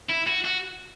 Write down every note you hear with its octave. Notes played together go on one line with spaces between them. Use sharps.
E4
F#4
F#4